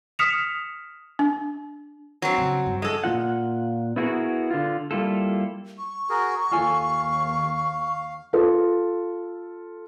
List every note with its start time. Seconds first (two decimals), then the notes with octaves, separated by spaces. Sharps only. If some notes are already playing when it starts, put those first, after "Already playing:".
0.19 D#6 F6 B6 C#7 E7 F7
1.19 D4
2.22 F#3 C4
2.38 C#3
2.66 G2
2.82 G#3 A4
3.04 A#2 E3 F4 F#5
3.96 B3 E4 F#4 G#4 A#4
4.51 D3 F4
4.91 G3 A#3 E4 F4 A4
5.78 C#6
6.10 F#4 G#4 A#4
6.51 D#2 F4 A4 F5 G#5
8.33 F4 A4